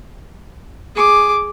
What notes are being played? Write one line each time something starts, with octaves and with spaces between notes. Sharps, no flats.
G#4 D6